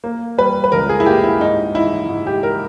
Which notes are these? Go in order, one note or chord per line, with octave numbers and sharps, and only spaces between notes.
A#3
G3 B4
B4
C#2 A#4
G#4
E4
A#3 G4
E4
G#2 D#4
G#2 E4
G#2
G4
A#4